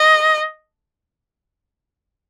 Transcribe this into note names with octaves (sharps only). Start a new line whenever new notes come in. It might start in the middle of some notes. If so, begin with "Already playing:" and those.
Already playing: D#5